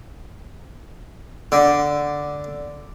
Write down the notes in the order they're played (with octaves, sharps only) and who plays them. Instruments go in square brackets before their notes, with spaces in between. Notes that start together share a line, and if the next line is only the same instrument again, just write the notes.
[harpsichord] D3